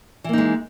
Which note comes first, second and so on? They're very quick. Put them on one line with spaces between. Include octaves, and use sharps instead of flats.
E3 A#3 D#4 G#3